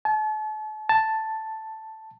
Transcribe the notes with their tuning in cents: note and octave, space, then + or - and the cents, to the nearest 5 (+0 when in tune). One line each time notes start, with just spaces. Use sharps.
A5 -40
A5 +0